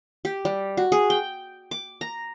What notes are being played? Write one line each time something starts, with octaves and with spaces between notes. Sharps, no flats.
G4
G3
F#4
G#4
G5
D6
A#5